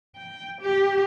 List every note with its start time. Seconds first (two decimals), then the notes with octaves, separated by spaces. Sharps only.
0.16 G5
0.62 G4